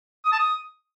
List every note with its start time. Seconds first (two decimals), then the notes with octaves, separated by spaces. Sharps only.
0.25 D#6
0.32 A5
0.39 D#6